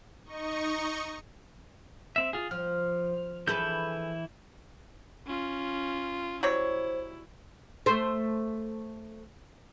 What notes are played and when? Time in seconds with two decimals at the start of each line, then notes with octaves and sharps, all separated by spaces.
0.25 D#4 D#5 C#6
2.16 C4 E5
2.33 F4 G#4
2.51 F3 F6
3.47 E3 E4 G#4 A4 B4 G6
5.26 C#4 F4
6.43 F#3 G3 E4 C5 C#5
7.86 A3 C5